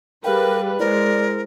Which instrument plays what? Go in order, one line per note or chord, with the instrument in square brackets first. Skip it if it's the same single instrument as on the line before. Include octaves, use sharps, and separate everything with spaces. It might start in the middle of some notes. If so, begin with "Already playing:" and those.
[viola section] G3 B4 [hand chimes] G#4 F5 G5 [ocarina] A#4
[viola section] G#3 [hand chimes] E4 C5 [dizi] A#4 [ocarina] D5